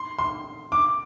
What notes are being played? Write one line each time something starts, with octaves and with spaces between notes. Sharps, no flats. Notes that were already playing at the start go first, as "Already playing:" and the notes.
Already playing: C6
C6
D6